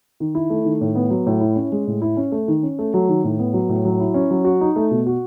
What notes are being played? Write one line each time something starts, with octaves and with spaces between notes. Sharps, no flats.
D#3
E4
A3
D#3
A2
B3
F#3
A2
E4
C#4
G#3
A2
E4
C#4
A3
D#3
C#4
A3
F#3
D#3
A2
B3
F#3
A2
F#3
E4
C#4
F#3
F#4
D#4
A3
B2
F#4